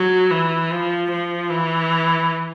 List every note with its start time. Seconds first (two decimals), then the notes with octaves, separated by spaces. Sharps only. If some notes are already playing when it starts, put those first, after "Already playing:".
Already playing: F#3
0.31 E3
0.71 F3
1.10 F3
1.50 E3